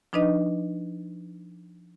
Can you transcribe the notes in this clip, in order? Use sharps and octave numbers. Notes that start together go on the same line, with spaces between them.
F3 D4 D#4 B4 D#5